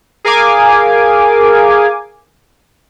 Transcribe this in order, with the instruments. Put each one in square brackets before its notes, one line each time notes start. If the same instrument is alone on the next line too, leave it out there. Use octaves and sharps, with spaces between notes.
[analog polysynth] G#4 A#4 F5 G#5 D6